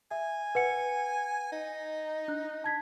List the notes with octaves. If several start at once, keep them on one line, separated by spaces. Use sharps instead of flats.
E5 G#5
B4 F#5 C#7
D#4
D4 F#6
A5 G#6 B6